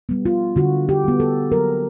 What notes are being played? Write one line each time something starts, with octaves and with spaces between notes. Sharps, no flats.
G3 B3
F4
D3 F#4
G4
G3 B3
A4
F#3 A#4